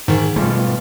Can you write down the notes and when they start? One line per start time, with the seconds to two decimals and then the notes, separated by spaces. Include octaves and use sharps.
0.08 G#2 D#3 G#4
0.36 B2 G3 A3 F4